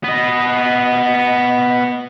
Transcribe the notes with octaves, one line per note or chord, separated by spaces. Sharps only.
B3 D#5